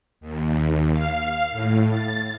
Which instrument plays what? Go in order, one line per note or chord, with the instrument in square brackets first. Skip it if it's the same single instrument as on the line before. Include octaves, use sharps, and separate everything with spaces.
[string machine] D#2
F5
A2
A6